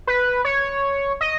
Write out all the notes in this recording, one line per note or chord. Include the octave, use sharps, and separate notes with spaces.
B4
C#5
D#5